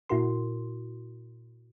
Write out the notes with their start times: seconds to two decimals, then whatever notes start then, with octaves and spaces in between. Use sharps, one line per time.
0.09 A#2 E4 F#4 A#4 C6